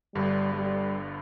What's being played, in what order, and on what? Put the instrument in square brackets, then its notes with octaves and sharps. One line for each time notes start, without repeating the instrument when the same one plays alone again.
[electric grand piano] G1 G2 D3 [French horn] G3
[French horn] G3